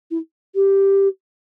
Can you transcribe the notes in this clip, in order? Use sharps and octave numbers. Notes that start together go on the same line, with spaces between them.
E4
G4